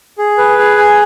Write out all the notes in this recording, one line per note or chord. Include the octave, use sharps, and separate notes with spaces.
G#4
B4
G#4
G#5